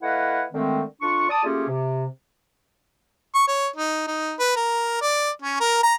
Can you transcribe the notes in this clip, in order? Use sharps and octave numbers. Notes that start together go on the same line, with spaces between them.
A3 E4 B4 D#5 F5 F#5
D3 D#3 G#3 A3 C4
F2 D4 F4 C#6
D5 A5 D#6
A3 A#3 C#4 F4 G4 G#4
C3
C#6
C#5
D#4
D#4
B4
A#4
D5
C#4
A#4
A#5